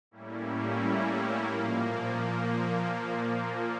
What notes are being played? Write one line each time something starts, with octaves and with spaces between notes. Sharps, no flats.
A2 G3 A#3 C#4 E4
A#2 F3 A#3